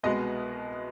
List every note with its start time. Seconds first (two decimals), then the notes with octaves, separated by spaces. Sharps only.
0.03 C2 B2 G#3 B3 D#5